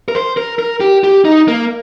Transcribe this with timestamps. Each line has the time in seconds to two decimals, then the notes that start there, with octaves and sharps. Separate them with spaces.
0.08 A#4
0.15 C5
0.37 A#4
0.59 A#4
0.80 G4
1.04 G4
1.25 D#4
1.48 A#3